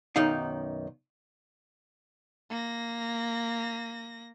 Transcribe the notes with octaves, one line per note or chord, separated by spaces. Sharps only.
B1 F#2 D#3 D#4 F5
A#3 A#6